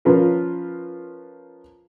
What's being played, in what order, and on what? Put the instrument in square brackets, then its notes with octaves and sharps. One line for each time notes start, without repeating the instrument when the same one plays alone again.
[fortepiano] F3 C#4 F4 A#4 B4